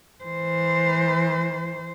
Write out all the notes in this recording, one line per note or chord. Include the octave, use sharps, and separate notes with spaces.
E3 C5